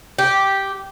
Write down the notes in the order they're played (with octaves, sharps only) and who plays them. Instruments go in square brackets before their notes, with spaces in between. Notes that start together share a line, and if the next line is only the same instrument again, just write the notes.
[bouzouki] G4